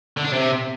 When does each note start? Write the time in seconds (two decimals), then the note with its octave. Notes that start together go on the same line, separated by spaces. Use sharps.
0.17 D3
0.24 D4
0.32 C3